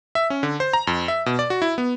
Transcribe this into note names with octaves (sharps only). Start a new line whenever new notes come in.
E5
C#4
D3
C5
A#5
F2
E5
B2
D5
F#4
E4
B3